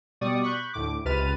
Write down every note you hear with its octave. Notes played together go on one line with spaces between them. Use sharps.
B2 G3 D5 C#6 D#6
B5 C#6 F#6 G6
D2 A2 D6
C#2 C3 B4 F6 A6 D#7